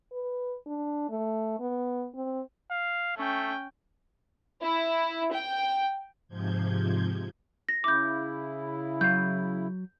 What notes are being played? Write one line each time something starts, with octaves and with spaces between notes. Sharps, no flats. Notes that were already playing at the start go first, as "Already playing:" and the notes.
B4
D4
A3
B3
C4
F5
A3 C#4 G5
E4
G5
G#2 C3 F3 G6 G#6
A#6
C#3 E4 D6 G6
F#3 F5 G6